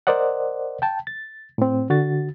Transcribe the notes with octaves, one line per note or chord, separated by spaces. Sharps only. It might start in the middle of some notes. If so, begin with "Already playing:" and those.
A#4 C5 D5 D#5 F#5
G5 A5
A6
A2 C4
D3 F#4 A6